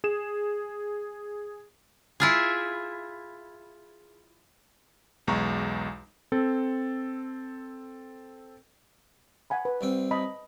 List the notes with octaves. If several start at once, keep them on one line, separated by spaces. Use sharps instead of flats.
G#4 E7
E4 F4 G#4
B1 E2 G#3 A#5 C#6
C4 A4
F#5 G#5 B5
B4
C2 C4
D#5 A5 B5